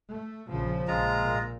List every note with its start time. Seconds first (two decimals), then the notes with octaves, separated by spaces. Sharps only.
0.11 A3
0.48 A#1 C#3 F3
0.88 A#1 G#3 F4 A#5
1.24 A#2